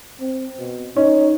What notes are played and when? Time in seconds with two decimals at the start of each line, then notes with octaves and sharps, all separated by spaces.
0.21 C4
0.59 B2
0.97 C#4 D#4